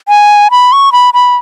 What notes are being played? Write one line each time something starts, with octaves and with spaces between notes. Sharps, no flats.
G#5
B5
C#6
B5
B5